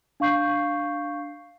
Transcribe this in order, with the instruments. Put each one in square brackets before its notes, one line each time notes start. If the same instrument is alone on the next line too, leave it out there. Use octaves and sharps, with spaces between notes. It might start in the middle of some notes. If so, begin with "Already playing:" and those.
[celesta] D4 F5 C#6 G6 C7